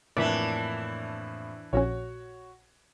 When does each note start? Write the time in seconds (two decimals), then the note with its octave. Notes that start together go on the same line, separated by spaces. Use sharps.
0.17 F2 A2 E3 A#3 D4 D5 E5 B5
1.73 A#1 C#4 F#4 C#5